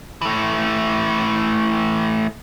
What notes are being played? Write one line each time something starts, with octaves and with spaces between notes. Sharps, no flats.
E3 A3